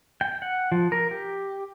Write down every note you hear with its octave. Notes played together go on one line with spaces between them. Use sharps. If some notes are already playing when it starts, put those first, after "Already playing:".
G5
F#5
F3
A#4
G4